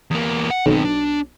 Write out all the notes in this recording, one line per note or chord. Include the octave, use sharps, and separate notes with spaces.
E2 A#3
F#5
B1 D#3 C4
D4